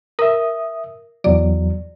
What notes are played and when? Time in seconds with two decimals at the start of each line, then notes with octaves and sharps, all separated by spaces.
0.19 A#4 E5 D#6
1.24 E2 F#3 D5